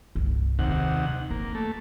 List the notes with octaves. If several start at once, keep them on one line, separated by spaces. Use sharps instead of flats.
C2 G2
D#2 C3 C4 F#5
A#3 F4
A3